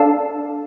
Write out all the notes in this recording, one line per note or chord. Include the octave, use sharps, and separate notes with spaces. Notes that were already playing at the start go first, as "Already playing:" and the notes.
Already playing: D4 A4 D5 F5 A5